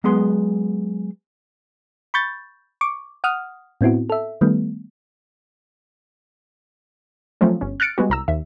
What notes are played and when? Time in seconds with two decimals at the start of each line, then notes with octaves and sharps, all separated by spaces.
0.04 F#3 G#3 B3 G#4 C6
2.14 B5 C#6 G6 A6
2.81 C#6 D6
3.24 F#5 D#6 F6
3.81 A2 B3 C4 E4 F#4
4.10 A4 E5
4.41 D#3 G3 A3 B3
7.41 F3 F#3 A3 C4 C#4
7.61 G1 C#4
7.80 F6 F#6 A6 C#7 D7
7.98 G3 G#3 B3 F#4
8.10 C2 A#5 E6
8.28 D#2 E5